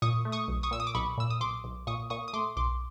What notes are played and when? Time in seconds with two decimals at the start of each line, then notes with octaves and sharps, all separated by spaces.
0.02 A#2 C#6 D#6
0.25 A3
0.32 C#6 D#6
0.48 B1
0.63 C#6 D#6
0.71 A#2 E6
0.80 D#6
0.87 D6
0.95 B1 B5 C#6
1.18 A#2 E6
1.30 D#6
1.41 B1 C6 D6
1.64 B1
1.87 A#2 C#6 D#6
2.10 A#2 C#6 D#6
2.28 D#6
2.34 A3 C6 D6
2.57 B1 C6 D6